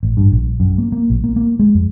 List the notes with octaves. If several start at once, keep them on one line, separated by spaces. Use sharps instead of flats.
A1
G2
A#1
F#2
A#3
A#3
A#1
A#3
A#3
G#3
F2